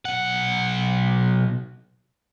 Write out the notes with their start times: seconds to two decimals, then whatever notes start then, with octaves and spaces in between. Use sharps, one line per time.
0.05 B1 F#5